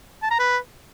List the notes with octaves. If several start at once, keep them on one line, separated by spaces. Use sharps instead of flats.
A5
A#5
B4